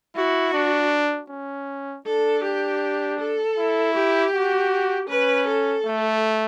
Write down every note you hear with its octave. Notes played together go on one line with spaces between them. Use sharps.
E4 F#4
D4
C#4
D4 A4
G4
A4
E4
G4
F#4
C#4 B4
A4
A3